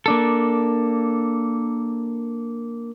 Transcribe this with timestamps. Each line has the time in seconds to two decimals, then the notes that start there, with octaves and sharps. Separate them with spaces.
0.06 A#3 D4 A4